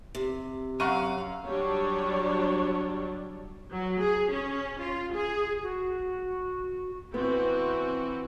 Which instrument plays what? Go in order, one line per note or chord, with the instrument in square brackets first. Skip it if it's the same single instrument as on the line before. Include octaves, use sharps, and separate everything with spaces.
[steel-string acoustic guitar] C3
[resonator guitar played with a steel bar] F#2 [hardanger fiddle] F5 [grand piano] F#5 C#6 D#7
[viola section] F#3 G3 D4 C#5
F#3
G#4
C#4
F4
G#4
[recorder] F#4
[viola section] E3 C4 F#4 [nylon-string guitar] B3